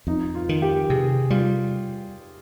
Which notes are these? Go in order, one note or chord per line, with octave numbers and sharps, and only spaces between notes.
F2 D#4
F4
D#3
G4
C3 G#4
G3 F4